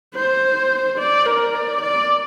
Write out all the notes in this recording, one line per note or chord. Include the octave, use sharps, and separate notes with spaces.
C5
D5
A#4
D5
D5